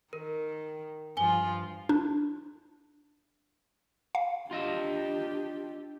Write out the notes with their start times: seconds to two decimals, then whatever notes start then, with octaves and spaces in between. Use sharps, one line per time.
0.13 D#3 A#4
1.17 G2 F3 F4 G#5 G7
1.89 D4
4.15 F5
4.51 D4 F4 G4 D#5 E5